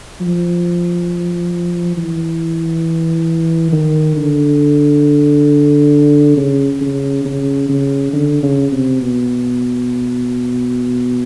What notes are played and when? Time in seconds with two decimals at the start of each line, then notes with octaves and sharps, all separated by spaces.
0.21 F3
1.97 E3
3.72 D#3
4.16 D3
6.36 C#3
6.81 C#3
7.25 C#3
7.69 C#3
8.13 D3
8.42 C#3
8.72 C3
9.01 B2